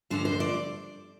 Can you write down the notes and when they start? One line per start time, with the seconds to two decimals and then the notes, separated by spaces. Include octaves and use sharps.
0.10 G2 D3 F3 C5
0.25 C5
0.40 D5